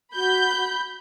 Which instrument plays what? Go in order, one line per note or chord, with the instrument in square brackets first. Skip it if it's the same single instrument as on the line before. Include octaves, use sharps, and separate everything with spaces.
[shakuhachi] F#4 [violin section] B5 G6